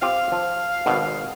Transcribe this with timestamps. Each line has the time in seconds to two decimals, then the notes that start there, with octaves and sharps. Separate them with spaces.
0.02 C4 F4 G4 F5
0.32 F3
0.86 G#1 B2